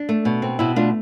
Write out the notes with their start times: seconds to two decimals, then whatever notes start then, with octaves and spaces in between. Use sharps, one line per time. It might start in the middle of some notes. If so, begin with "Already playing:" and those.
Already playing: D4
0.09 A3
0.25 B2
0.42 C4
0.59 B2 E4
0.76 A3 D4 F4